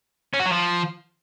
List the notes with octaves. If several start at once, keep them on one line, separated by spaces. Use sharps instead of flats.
C#4
F#4
F#3
F3